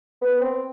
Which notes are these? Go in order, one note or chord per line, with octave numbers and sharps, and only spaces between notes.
B3
C4